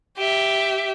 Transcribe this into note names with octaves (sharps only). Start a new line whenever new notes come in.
G4 E5